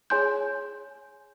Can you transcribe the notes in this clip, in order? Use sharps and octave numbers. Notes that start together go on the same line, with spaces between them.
G#4 C#5 G#5 C6 G6